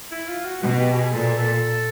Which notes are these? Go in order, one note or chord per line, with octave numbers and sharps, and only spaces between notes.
E4
F4
F#4
B2 F#4
G4
G#4
A#2 A4
A4